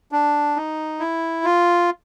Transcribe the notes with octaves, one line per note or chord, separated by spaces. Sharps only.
D4
D#4
E4
F4